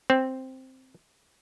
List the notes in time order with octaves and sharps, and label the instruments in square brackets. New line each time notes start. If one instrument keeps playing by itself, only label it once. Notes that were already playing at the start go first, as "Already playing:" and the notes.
[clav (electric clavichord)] C4